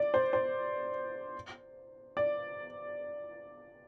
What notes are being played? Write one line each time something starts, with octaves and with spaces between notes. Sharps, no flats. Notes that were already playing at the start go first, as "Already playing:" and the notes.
Already playing: D5
C5
C5
D5